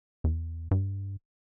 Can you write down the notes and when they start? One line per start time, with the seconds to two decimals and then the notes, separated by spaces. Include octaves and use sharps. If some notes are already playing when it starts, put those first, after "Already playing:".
0.24 E2
0.71 G2